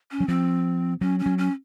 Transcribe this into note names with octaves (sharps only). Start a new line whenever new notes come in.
C#4
F#3
F3 C4
F#3 C#4
C#4
F#3
C#4